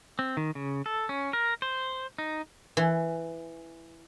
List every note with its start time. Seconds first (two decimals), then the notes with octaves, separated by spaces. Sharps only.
0.19 C4
0.37 D#3
0.55 C#3
0.86 A4
1.09 C#4
1.33 A#4
1.62 C5
2.18 D#4
2.77 E3